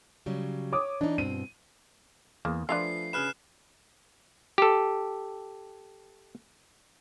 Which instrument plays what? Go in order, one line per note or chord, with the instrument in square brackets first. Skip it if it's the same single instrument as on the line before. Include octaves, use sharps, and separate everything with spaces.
[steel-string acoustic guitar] C#3 F#3 G3
[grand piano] C#5 D6 D#6
[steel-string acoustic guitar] E3 D#4 [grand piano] D4
[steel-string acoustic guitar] G2 B2 C4 [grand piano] D#7
[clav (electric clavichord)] E2 G#4 [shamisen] A#3
[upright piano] F3 A3 B4 [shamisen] D4 E4 F4 [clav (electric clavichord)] G#5 [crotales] C7
[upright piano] C#3 G#4 B4 [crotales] F6 F#6 E7
[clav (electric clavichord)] G4 A4